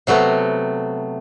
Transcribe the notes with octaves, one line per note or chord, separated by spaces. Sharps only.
C3 F#3 A3 B3